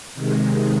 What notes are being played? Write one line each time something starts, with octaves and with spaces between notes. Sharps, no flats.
C3 D#3 G#3